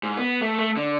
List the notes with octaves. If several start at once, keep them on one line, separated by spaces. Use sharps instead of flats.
G#2
B3
A3 A4
A3
D3